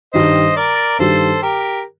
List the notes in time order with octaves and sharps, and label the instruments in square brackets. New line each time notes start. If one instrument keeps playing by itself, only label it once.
[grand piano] G2 D#3 G3 [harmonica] C5 D#5
[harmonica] A#4 D5
[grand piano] G2 D#3 G3 [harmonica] A4 C5
[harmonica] G4 A#4